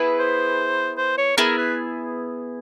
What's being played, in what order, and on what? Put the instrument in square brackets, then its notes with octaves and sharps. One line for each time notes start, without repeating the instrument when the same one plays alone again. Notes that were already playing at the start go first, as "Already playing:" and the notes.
Already playing: [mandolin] B3 E4 G#4 B4
[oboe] C5
C5
C#5
[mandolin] B3 E4 G#4 [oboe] A#4
[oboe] B4